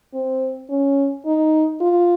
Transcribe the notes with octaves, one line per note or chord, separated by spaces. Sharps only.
C4
C#4
D#4
F4